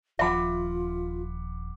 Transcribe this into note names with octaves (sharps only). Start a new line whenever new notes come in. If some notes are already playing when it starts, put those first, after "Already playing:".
D#1 F3 F4 E5 F#5 B5 D6